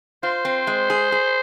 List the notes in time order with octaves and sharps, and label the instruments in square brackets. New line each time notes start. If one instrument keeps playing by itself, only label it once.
[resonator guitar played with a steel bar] F4 [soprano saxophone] C5
[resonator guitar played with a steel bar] C4
G#3
G#4
G#4